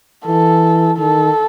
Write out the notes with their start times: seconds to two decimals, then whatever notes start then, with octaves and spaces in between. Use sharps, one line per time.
0.26 E3 A4
0.98 D#3 A4